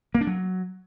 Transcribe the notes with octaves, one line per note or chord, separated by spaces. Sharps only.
A#3
D4
F#3